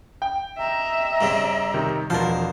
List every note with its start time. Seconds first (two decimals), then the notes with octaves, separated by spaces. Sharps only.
0.22 G5
0.59 D#5 E5 A#5
1.21 G2 C#3 C4
1.74 C3 D#3
2.10 E1 B2 F3 A#4 C5